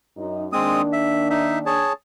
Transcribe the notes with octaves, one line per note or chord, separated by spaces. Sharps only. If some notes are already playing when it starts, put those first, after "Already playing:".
F#2 D#4
D#3 G#3 A#3 C4 D4 D#6
E5
D#4 E5
G#4 C#5 A5